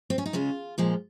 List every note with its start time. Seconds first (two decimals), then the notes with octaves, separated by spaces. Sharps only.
0.10 C4
0.18 C#4
0.26 D#4
0.33 C#3 G#3 F4
0.78 A#2 F3 G#3